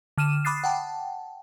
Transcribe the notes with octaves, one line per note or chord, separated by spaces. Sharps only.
D3 F6 D#7 E7
B5 D6 D#6 F#6 A6 C7
F#5 G5 A5